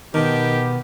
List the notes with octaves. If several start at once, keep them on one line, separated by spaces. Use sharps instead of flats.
B2 D#3 B3 G4 A5 A#5